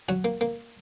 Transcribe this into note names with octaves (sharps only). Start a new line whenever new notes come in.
F#3 F#4
A#3
A#3